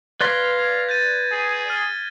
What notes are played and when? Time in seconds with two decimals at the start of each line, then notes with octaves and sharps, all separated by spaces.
0.21 B4 D5 F5 C6 G#6 A#6 B6
0.59 G#6
0.89 G6 A6 D#7
1.32 G#4
1.68 F6 A6 D#7